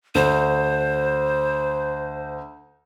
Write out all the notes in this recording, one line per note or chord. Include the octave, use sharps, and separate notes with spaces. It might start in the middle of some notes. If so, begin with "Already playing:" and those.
D2 C5